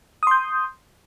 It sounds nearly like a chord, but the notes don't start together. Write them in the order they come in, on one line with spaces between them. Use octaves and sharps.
D#6 C6 G6